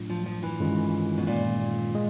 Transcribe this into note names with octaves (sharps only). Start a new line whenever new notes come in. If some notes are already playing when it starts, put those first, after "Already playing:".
Already playing: A2 F#3 A3 D4 F4
F3
F3
E3
G2 D#3 G#3 C#4 F4
B2
A#2
G#3